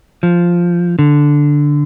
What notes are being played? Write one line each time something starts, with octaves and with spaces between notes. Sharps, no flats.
F3
D3